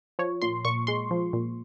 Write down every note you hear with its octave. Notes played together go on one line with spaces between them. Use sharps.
F3 C#5
A#2 C6
A#2 C#6
G#3 C6
F3
A#2